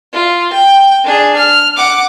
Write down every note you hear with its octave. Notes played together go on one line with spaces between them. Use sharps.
F4
G5
D4 G#4
F6
F#5 D6